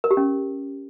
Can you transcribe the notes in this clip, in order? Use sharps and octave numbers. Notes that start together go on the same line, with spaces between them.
A#4
G4
C#4